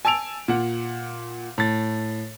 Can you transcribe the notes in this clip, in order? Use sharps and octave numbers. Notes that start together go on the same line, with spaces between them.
G#5 A5 E6 D7 F7
A#2 F#5
A2 A6